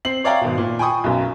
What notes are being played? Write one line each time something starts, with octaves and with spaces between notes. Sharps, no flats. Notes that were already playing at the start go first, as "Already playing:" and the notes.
C4 C7 F#7
C#5 D5 E5 F5 G5 A#5
G#1 B2
A#2
G5 G#5 B5 C#6 D#6
B1 F#2